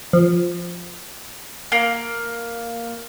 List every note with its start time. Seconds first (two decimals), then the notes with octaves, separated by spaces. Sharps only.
0.13 F3
1.72 A#3